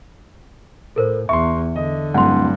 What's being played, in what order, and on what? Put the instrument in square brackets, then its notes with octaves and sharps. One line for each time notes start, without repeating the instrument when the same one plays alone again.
[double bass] A2 [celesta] A4 A#4 C5
[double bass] E2 [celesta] E5 [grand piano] C6 C#6
[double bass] D3 [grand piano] D#5
[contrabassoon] D1 [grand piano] G2 [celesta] F#5 C6